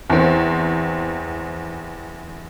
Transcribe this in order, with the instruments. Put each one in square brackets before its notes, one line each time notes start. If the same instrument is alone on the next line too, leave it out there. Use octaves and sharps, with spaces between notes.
[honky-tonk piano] E2 C4